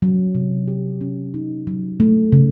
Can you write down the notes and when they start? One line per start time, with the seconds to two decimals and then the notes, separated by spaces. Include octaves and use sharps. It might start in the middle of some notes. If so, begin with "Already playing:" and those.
0.02 F#3
0.35 C3
0.68 G4
1.01 C#4
1.34 D#4
1.67 F#3
2.00 A3
2.32 C#3